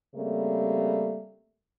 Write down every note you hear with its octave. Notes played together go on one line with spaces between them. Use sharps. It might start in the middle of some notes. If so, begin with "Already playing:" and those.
C#3 G3 A3 A#3 C4